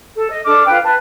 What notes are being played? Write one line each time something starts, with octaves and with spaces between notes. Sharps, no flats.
A4
D#5
D4 A4 D6 F6
F4 B4 G5
B4 A5